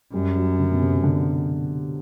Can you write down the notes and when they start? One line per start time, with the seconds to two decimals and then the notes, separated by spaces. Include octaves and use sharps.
0.13 F#2 G3
0.36 F#3
0.59 D3
0.71 B2
0.81 C3
1.04 D3